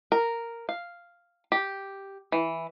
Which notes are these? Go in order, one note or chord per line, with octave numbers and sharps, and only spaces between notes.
A#4
F5
G4
E3